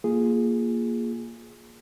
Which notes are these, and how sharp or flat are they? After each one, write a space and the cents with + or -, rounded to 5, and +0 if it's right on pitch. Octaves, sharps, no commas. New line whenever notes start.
A#3 +0 F4 +0 G#4 +0